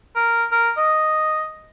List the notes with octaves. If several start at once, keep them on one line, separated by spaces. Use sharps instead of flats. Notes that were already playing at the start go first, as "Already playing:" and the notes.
A#4
A#4
D#5